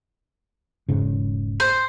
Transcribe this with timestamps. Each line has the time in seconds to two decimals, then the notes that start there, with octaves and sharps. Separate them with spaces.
0.89 E1 G#2 C#3
1.60 C5